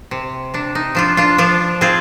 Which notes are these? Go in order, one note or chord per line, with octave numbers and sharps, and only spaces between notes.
C3
C3 D4
D#4
F3 D4 F4
D4 F4
F3 D4 F4
C4 F4 G#4